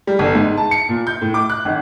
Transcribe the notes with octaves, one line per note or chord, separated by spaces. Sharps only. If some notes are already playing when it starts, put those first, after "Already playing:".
G3
G1
G#2
A5
C#7
A#2
G6
A2
D6
F#6
G#1